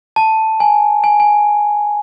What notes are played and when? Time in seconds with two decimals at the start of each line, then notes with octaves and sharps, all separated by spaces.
0.16 A5
0.60 G#5
1.04 G#5
1.20 G#5